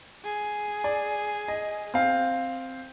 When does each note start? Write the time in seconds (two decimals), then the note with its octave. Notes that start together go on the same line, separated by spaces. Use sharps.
0.24 G#4
0.84 D5
1.48 D#5
1.94 C4 F5